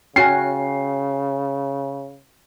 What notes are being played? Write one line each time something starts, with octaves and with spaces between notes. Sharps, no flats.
C#3 C#4 F#4 G5 G#5 C7